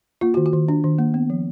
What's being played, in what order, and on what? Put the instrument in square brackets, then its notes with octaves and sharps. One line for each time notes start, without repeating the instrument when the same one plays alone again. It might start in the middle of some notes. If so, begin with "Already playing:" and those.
[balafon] A#3 F4
F#4
D#3
F#4
D#3
D4
D#3
A#3
B3
F3